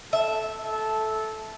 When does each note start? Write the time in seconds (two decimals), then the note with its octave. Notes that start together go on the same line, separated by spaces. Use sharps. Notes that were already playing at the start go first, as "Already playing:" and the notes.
0.13 A4 E5
0.57 A4